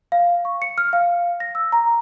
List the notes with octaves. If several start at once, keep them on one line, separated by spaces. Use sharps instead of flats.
F5
C#6
C#7
F6
F5
A#6
E6
A#5